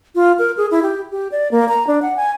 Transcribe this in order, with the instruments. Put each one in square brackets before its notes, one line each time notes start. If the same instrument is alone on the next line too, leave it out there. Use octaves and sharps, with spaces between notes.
[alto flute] F4
A#4
G#4
E4
G4
G4
D5
A#3
A#5
D4
F#5
G#5